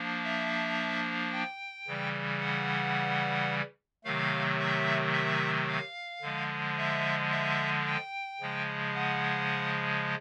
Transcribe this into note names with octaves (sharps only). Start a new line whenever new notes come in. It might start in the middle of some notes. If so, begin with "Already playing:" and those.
Already playing: F3 A#3 D4
E5
G5
C#3 E3 G3
F#5
C3 D#3 F#3 A3 F5
E5
E5
F5
D3 F3 G#3
E5
E5
G5
C#3 F3 G#3
F#5